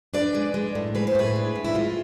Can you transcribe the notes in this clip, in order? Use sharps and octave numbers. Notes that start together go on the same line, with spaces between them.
D4 B4 D5
G#3
G#3
A2
G#3 B4
C5
A2 G#4 B4
D4
A2
E4
G#3 F4